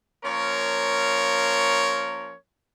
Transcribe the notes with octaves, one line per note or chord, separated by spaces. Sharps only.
F3 A#3 C#4 A#4 C#5